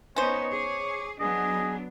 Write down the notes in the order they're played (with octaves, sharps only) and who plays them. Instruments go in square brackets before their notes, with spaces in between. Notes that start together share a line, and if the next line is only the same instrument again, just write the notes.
[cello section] B3 D#4 [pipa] C#4 C5 [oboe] C#5
[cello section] G#4 [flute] D6
[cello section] F#3 B3 D4 [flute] G#4 [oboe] D#5